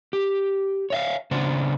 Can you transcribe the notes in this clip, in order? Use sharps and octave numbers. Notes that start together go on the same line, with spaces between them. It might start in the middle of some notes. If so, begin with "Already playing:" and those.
G4
C#5 E5 F5
C#3 D4 C5 F#5